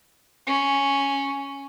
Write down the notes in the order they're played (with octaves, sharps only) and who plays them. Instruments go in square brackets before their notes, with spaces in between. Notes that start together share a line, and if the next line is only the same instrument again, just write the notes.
[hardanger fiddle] C#4